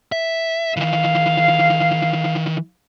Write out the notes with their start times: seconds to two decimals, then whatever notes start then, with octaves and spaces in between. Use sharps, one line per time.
0.12 E5
0.77 D#3 E3 F5